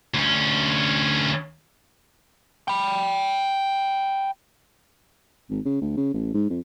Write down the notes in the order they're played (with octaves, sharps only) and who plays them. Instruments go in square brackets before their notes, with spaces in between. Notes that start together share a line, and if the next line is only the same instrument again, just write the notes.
[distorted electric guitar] D2 C#4
[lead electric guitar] G5 B5
[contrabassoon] G#1
C#3
D2
C#3
A1
G#2
F2